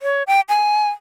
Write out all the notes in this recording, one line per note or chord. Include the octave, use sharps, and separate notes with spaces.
C#5
G5
G#5